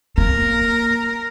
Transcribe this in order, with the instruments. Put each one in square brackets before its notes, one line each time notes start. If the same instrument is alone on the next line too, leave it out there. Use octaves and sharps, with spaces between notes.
[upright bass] A#3 [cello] A#4